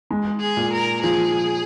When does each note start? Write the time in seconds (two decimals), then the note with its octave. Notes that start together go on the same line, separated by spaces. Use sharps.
0.10 G#3
0.41 G#4
0.57 A#2
0.73 A#4
1.03 F3 G#4